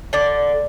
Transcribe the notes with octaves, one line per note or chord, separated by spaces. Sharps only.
D3 D5